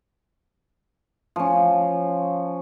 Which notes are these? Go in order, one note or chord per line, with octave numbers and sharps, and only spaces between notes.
F3 C#4